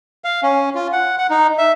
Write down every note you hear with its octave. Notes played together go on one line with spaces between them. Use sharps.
F5
C#4
F4
F#5
F#5
D#4
E5